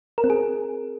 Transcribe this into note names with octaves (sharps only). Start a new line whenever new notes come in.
A#4
C4
G#4